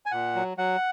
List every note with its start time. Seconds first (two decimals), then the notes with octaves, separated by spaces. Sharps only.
0.06 G#5
0.12 A#2 F#5
0.35 F#3
0.57 F#3 F#5